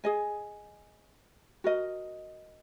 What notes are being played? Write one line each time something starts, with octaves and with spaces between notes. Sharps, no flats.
G#4 D#5 G#5
F#4 A#4 D#5